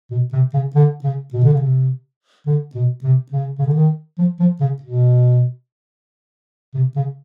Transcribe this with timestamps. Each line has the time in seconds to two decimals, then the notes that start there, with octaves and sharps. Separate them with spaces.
0.11 B2
0.33 C3
0.54 C#3
0.75 D3
1.04 C#3
1.33 B2
1.44 D3
1.53 C#3
1.61 C3
2.46 D3
2.75 B2
3.03 C3
3.32 C#3
3.59 C#3
3.67 D3
3.74 D#3
4.18 F3
4.40 F3
4.60 C#3
4.82 B2
6.74 C3
6.96 C#3